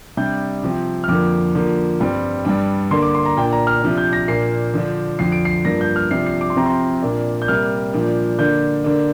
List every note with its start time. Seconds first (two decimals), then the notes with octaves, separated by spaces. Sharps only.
0.17 C3 G3 D4 G6
0.63 C3 F3 C4
1.04 F6
1.08 F2 D3 F3 A#3 D6
1.55 D3 F3 A#3
2.00 G2 G3 C4
2.45 G2 G3 D4
2.91 D3 A#3 D4 C6
3.02 D6
3.15 C6
3.25 A#5
3.37 A#2 A#3 D4 G5
3.52 A#5
3.67 F6
3.82 C3 F3 D4
3.98 G6
4.13 A#6
4.28 A#2 A#3 D4 C7
4.74 D3 F3 D4
5.19 F2 D3 F3 C7
5.32 D7
5.45 C7
5.65 G2 F3 A#3 D4 A#6
5.81 G6
5.96 F6
6.11 C3 F3 D4 C7
6.26 C7
6.41 D6
6.50 C6
6.56 C3 F3 C4 A#5
6.66 C6
7.03 A#2 A#3 D4
7.42 G6
7.48 C3 G3 A#3 F6
7.93 A#2 F3 A#3 D4
8.39 D3 A#3 D4 G6
8.84 D3 A#3 D4